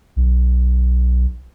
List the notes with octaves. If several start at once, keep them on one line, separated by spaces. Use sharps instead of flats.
B1